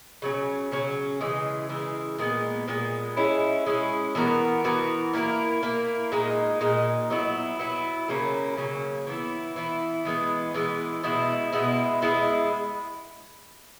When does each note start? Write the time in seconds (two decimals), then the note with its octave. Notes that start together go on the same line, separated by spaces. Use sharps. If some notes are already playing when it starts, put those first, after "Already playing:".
0.22 C#3 F#3 C#4
0.72 C#3 F#3 C#4
1.20 C#3 E3 G#3
1.69 C#3 E3 G#3
2.18 A#2 G#3 B3
2.68 A#2 G#3 B3
3.17 G#3 C#4 E4
3.66 G#3 C#4 E4
4.15 E3 B3 F#4 A#4
4.64 E3 B3 F#4 A#4
5.13 A#3 E4 A#4
5.63 A#3 E4 A#4
6.12 A#2 G#3 D#4
6.61 A#2 G#3 D#4
7.10 F#3 B3 E4
7.59 F#3 B3 E4
8.08 C#3 F#3 A#3 C#4
8.57 C#3 F#3 A#3 C#4
9.07 E3 B3 E4
9.56 E3 B3 E4
10.05 E3 G#3 B3
10.54 E3 G#3 B3
11.03 B2 G#3 B3 E4
11.52 B2 G#3 B3 E4
12.02 G#3 B3 E4